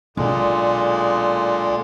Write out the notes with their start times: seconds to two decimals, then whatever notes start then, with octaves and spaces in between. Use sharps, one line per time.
0.17 B1 A#2 D3 G#3